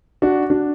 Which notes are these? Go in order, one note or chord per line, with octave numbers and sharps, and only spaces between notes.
D4 F#4
D4 F#4